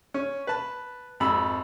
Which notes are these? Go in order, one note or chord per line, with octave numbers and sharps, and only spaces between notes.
C#4
B4 A5
G#1 F2 B5 E6